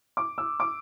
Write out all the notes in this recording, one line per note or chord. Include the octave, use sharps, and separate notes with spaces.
D6
E6
D6